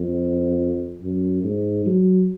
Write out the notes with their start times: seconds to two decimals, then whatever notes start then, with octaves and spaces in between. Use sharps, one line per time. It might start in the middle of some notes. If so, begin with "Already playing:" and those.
Already playing: F2
1.02 F#2
1.44 G#2
1.86 F#3